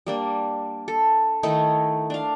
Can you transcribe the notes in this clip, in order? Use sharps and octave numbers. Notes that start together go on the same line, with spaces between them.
G3 A#3 D4
A4
D#3 A3 D#4 E4
D4 F5